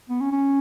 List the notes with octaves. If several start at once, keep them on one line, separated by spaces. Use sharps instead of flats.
B3
C#4
C#4